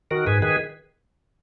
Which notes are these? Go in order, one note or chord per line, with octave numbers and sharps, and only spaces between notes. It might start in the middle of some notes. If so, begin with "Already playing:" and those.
D#3 F#4 A#4
G#2 G#4 B4
D#3 G#4 B4